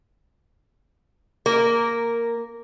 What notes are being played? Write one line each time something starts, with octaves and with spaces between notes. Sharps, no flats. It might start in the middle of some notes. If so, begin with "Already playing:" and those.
A#3 A#4